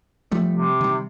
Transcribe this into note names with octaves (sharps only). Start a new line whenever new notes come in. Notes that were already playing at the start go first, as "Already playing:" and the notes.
F3 G3 A3
C3
D#3 G3